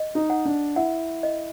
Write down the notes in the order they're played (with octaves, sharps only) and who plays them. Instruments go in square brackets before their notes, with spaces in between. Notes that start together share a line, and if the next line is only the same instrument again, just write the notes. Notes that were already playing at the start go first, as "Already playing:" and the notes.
Already playing: [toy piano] D#5
[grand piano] D#4
[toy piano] F#5
[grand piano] D4
[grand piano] E4 [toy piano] F#5
[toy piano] D#5